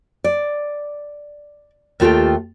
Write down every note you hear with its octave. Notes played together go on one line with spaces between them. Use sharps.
D5
D#2 A3 F4 G4 A4 G5